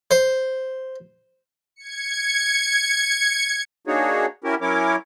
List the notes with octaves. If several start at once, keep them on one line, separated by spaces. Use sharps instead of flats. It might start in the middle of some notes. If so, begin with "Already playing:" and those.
C5
G#6 C#7
A#3 D4 D#4 F#4 G#4 C#5
C#4 E4 F#4 G4 A#4
F#3 C#4 E4 A#4 C#5 D6